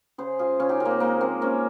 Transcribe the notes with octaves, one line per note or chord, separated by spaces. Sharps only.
C#3 G#4 C5
G#3 F4 G#4
C#3 C#4 F4
D#4 G4
C#3 G4 A#4
A#3 C4
G#3 A#3
G#3 C4
G#3 A#3 C#4